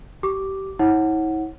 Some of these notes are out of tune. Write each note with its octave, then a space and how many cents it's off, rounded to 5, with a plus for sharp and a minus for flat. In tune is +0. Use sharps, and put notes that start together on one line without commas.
G4 -25 D6 +0
E4 -45 C#5 -30 F#5 +0